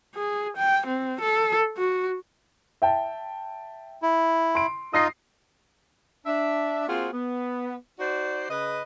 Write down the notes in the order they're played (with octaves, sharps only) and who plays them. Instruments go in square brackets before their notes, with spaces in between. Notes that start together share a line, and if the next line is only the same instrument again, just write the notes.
[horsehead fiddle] G#4
G5
C4
A4
F#4
[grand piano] E5 G5 A5
[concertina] E4
[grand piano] C6 D7
[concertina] D#4 F4 D#5 [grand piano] D#6 A#6 C7
[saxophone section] D4 E5
A#3 C4 F4 F#4 G#4 C5
B3
D#4 F#4 C5 D5
C#3 B4 D#5